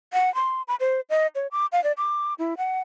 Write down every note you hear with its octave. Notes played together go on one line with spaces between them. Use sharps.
F#5
C6
B5
C5
D#5
C#5
D6
F5
D5
D6
E4
F#5